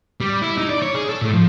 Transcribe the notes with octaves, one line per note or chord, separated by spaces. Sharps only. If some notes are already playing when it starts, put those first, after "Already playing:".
G3
E4
D#4
D5
C#5
G#4
A4
A2
F3